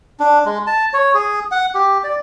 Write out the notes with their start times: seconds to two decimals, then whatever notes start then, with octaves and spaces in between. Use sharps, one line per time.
0.20 D4
0.45 G#3
0.67 A5
0.93 C#5
1.14 G#4
1.52 F#5
1.75 G4
2.04 D5